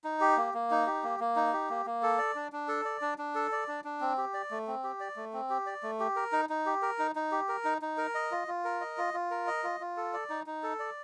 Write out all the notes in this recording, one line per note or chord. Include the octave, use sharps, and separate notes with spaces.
D#4
G4
A#3
A#3
D#4
G4
A#3
A#3
D#4
G4
A#3
A#3
A4
D5
D4
D4
A4
D5
D4
D4
A4
D5
D4
D4
C4
G4
D5
A3
C4
G4
D5
A3
C4
G4
D5
A3
G4
A#4
D#4
D#4
G4
A#4
D#4
D#4
G4
A#4
D#4
D#4
A#4
D#5
F4
F4
A#4
D#5
F4
F4
A#4
D#5
F4
F4
A4
D5
D#4
D#4
A4
D5